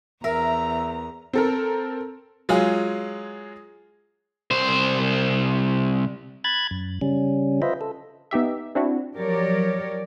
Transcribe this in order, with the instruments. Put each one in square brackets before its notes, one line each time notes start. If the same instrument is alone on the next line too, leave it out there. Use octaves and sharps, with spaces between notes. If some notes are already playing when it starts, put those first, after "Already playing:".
[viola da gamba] E2 [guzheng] A#4 [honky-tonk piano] E5 [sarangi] A#5
[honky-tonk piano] C4 A4 A#4
[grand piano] F#3 G#3 F4 G#4
[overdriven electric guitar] C2 C5
[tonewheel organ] B5 F#6 G#6 A6
F#2
C#3 G3 C#4
F4 B4 C5 D#5 E5
A4
[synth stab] B3 D#4 G4 E5
C4 D4 E4 F#4
[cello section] F3 F#3 G4 A#4 C#5 D5